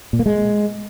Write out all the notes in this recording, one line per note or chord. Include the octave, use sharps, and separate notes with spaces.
A#2
A#3
G#3